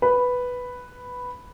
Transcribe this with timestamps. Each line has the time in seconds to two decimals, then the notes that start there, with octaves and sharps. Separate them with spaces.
0.02 B4